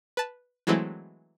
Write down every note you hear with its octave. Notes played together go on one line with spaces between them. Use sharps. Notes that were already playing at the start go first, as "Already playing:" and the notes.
B4 A5
E3 F#3 G#3 A3 C4 E4